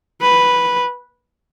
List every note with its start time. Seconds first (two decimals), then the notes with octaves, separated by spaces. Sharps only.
0.21 B4